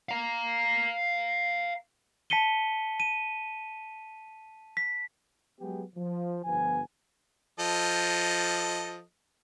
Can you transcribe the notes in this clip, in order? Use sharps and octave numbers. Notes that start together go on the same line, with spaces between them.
F5 A#5
A5 B6 C#7 D#7 G7
D#7
B6
F#3 G#3 B3 G4 G#4
F3
G1 F3 B3 G#5
F3 A4 D#5